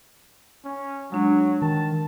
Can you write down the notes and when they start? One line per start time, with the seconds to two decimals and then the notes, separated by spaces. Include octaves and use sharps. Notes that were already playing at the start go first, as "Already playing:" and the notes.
0.65 C#4
1.12 F#3 G#3 D4
1.62 D#3 A5